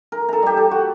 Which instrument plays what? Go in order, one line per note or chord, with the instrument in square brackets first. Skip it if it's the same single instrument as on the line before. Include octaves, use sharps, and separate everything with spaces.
[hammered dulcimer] A#4
A4 A#5
G3 G4
A4
F#4